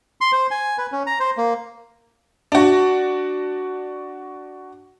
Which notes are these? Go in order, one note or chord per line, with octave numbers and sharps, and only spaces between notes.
C6
C5
G#5
B4
C#4
A#5
C5
A#3
D4 F#4